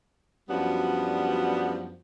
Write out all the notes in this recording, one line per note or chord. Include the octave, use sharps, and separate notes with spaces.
F#2 F3 G3 B3 D4 F#4